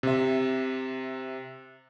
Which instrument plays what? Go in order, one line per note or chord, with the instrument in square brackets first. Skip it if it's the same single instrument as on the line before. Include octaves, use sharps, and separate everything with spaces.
[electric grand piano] C3 E5